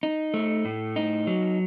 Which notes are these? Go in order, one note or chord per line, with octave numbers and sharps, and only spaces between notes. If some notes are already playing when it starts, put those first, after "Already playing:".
D#4
A3
A2
D#4
F#3